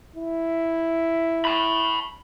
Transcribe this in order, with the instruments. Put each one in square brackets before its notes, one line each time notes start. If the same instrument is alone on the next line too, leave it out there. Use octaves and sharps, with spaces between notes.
[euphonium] E4
[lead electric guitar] A5 B5